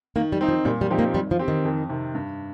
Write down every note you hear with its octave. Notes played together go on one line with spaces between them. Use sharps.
D#3 A#3
G3
C4 D#4
F3
A#2 G3
G3
F3 C4 D#4 G4
A#3
D#3 G3
F3
C4 G4
D#3
F2
C3 D#3
G2